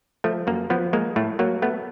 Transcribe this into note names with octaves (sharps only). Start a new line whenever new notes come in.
F3 A3
F#2 A#3
F3 B3
G#3 A#3
A2 A3
F#3 A#3
A3 B3